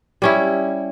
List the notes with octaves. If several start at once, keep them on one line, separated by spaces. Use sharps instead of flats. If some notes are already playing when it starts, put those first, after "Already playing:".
G3 C#4 E4